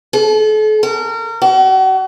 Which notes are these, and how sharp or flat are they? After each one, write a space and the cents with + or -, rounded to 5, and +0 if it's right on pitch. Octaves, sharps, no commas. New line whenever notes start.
A4 -40
A#4 -30
F#4 +40